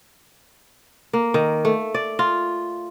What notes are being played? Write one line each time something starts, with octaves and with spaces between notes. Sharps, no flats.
A#3
D#3
A3
D5
F4